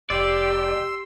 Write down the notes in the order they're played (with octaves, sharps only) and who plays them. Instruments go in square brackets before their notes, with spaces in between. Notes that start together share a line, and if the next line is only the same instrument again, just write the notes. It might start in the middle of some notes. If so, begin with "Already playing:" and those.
[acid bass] F1 [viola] G4 [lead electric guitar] D5 [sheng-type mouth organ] C6 E6